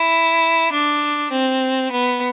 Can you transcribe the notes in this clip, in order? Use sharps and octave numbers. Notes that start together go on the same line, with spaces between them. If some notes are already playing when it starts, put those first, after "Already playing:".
Already playing: E4
D4
C4
B3